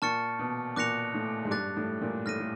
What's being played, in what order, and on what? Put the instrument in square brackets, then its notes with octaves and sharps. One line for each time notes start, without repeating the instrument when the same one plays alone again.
[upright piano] A#2 [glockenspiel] A5 C#6 F6 A6 C#7
[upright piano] B2
[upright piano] A#2 [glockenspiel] D6 F#6 A#6 C#7 F7
[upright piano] A2
G#2
[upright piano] G2 [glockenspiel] D6 F#6 A6
[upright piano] A2
A#2
[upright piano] A2 [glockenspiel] F6 A#6 D#7
[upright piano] A2